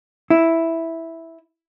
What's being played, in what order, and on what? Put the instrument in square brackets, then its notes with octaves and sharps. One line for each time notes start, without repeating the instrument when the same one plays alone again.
[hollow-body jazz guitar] E4